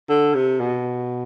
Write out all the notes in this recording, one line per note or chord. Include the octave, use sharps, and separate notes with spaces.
D3
C3
B2